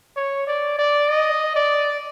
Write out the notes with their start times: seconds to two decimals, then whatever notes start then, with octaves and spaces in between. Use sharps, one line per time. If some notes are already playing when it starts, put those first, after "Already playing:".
0.17 C#5
0.47 D5
0.79 D5
1.09 D#5
1.56 D5